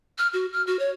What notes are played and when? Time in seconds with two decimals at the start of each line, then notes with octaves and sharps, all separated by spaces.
0.18 F6
0.33 F#4
0.53 F6
0.67 F#4
0.79 C#5